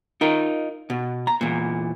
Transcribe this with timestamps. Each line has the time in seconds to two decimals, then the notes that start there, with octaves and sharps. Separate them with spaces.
0.21 D#4 F4 A#4
0.90 B2
1.27 A#5
1.41 E2 A#2